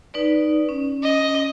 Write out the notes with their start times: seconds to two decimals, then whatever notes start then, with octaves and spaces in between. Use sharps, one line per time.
0.14 D#4 B4 D5
0.69 C#4
1.03 D#5